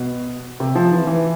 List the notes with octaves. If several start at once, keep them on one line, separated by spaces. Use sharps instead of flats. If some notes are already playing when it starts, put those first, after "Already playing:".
Already playing: B2
C3
F3
E3
E3